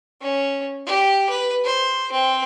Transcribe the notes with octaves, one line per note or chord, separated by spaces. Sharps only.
C#4
G4
B4
C5
C4